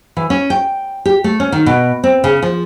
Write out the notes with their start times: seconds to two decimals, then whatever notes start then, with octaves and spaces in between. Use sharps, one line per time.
0.17 E3
0.30 C#4
0.50 G5
1.06 G4
1.24 A3
1.40 C#4
1.52 D#3
1.66 B2
2.04 C4
2.24 C#3
2.42 F3